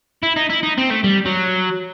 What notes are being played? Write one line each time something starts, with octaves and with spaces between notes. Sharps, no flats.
E4
D#4
E4
D#4
C4
A3
G3
F#3